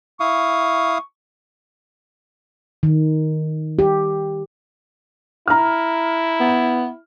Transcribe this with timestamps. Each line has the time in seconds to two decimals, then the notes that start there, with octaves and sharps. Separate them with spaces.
0.20 E4 F5 C#6 D#6
2.83 D#3
3.79 G4
5.48 E4 A#5 F6
6.40 B3